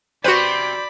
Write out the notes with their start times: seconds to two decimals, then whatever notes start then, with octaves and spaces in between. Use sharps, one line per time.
0.24 C3 C4 F#4 B4 C5 D5 B5